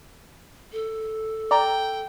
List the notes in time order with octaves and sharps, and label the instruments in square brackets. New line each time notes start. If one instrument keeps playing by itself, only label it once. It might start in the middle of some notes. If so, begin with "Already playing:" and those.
[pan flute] A4
[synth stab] D5 A#5 [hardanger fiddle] G5